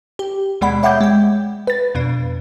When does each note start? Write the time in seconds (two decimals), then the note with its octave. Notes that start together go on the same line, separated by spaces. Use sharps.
0.19 G4
0.61 D#2 B2 G#3 D5 F#5 B5
0.83 C#5 E5 F#5 G5 D6 G6
1.01 G#3 G5
1.67 B4 A6
1.95 F2 B2 D4